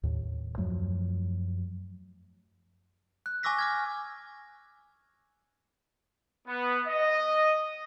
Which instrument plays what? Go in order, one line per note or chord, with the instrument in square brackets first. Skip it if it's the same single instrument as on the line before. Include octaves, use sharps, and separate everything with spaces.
[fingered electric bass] D#2 A2
F#2 F3 F#3 A3
[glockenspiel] F#6
G#5 C#6 D6 E6 A#6 B6
D6 F6 G#6
[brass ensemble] B3
D#5